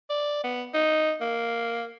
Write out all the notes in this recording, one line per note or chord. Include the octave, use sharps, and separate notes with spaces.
D5
B3
D#4
A#3